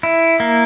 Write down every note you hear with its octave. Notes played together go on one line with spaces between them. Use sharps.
E4
A#3